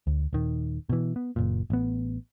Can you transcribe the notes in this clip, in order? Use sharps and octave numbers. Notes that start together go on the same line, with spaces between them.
D2
D#1 D#3
B2 E3
B3
F#1 A#2
A1 B3